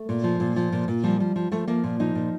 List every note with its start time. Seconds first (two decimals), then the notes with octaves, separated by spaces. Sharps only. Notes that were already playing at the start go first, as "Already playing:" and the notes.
Already playing: A3
0.09 A#2
0.24 F3
0.40 A#2
0.56 F3
0.72 A#2
0.88 A#2
1.04 F3 G3
1.20 F3
1.36 F3
1.52 F3 A3
1.68 F3 A#3
1.84 A#2
2.00 F3 D#4
2.15 A#2